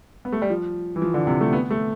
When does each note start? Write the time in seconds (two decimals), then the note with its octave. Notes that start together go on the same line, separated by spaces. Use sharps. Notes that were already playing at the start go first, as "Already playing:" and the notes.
0.25 B3
0.32 A3
0.42 G3
0.50 F3
0.96 E3
1.02 F3
1.14 D3
1.27 C3
1.41 A3
1.53 B3
1.70 A3